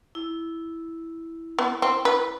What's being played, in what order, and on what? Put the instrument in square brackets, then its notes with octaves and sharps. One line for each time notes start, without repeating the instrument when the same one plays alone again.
[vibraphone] E4
[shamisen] B3
C4
B4